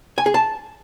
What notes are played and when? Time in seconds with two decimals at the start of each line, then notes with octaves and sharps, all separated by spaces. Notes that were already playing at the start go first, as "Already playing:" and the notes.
0.18 G#5
0.26 G#4
0.34 A5